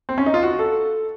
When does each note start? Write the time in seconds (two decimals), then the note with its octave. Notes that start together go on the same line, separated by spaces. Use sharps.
0.09 C4
0.18 C#4
0.26 D#4
0.34 F4
0.43 F#4
0.59 A4